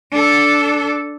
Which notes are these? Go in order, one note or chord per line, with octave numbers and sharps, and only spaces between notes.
D4 A4